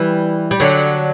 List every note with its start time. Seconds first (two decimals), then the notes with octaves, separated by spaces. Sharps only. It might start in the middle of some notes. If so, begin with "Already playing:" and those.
Already playing: E3 G3
0.51 G3
0.60 D3 F#3